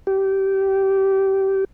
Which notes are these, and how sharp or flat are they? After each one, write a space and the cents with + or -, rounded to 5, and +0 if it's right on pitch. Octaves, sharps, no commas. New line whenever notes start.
G4 -20